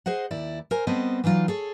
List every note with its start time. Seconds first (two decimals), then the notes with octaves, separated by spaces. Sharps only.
0.06 G#4 C5 D#5 F#5
0.31 D#2 E4 D5
0.71 A#4 C5 G#5
0.87 G3 B3 C4 A4 C5 D#5
1.24 E3 F#3 D#4 F4 D5
1.48 G#4 A4 C#5